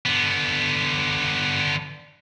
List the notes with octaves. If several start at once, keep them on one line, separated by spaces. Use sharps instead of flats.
D3 B3